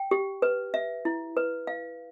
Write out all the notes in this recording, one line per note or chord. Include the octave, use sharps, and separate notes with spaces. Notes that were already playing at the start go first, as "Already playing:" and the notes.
Already playing: G5
G4
B4
E5
E4
B4
F5